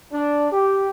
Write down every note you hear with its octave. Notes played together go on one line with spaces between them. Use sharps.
D4
G4